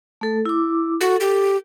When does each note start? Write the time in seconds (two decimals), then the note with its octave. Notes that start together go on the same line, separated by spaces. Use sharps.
0.21 A3 A4
0.45 E4 D6
1.01 F#4 A4
1.20 G4